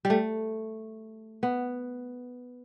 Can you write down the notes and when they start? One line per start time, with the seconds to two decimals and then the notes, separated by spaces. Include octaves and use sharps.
0.05 G3
0.10 A3
1.43 B3